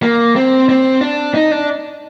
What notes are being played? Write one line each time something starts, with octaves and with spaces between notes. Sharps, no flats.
A#3
C4
C4
D4
D#4
D4